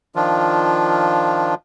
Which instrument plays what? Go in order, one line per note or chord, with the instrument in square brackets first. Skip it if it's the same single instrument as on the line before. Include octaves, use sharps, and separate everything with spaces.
[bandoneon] D#3 F3 D4 F4